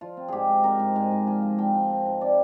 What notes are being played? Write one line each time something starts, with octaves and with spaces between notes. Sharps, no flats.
F3 F4
C4
G#2 G4 G#4
G#2
C4 A#4
G#2
G#2 G#5
G#2
F3 G#5
F3
F3 G5
F3
C4
G#2
C4 D5